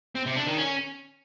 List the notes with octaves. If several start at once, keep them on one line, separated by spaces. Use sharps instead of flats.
C4
C3
D4
D#3
C#4